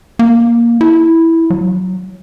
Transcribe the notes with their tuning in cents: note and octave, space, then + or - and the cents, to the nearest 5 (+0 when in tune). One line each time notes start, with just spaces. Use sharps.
A#3 +10
E4 -5
F#3 -5